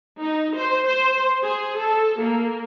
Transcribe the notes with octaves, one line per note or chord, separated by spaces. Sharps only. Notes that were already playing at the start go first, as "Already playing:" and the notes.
D#4
C5
C5
G#4
A4
A#3